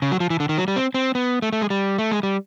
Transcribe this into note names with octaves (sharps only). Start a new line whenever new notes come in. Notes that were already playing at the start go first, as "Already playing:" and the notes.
C#3
F#3
F3
E3
D3
D#3
F#3
G3
C4
C4
B3
A3
A3
G#3
G3
A3
G#3
G3